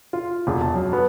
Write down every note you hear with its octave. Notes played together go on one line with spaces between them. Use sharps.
F4
E1
A5
F#2
B3